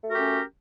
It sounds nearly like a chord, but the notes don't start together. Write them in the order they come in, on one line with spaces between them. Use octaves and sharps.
A3 F#4 A#4 G4 C#4